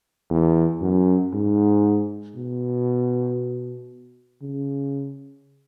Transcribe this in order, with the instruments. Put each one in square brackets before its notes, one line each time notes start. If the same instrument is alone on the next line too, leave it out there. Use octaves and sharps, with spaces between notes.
[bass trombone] E2
F#2
G#2
B2
C#3